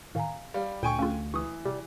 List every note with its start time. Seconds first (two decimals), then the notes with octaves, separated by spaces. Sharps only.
0.15 A2 D#3 F5 G#5 A#5
0.54 G3 F5
0.83 D2 A#2 G5 G#5 C#6
0.99 A3 C#4 F4 G#4 A4
1.34 E3 C#6 D#6
1.65 C3 G3